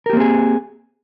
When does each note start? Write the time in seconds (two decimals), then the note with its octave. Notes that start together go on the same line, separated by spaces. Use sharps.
0.06 A#4
0.10 G4
0.13 A#3
0.17 C4
0.20 G#4